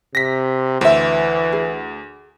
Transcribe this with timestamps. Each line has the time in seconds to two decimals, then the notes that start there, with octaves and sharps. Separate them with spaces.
0.15 C3 A#6 B6
0.81 D2 E3 C5 E5
1.53 G#4